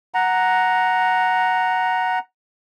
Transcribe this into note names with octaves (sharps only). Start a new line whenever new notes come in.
F#5 A#5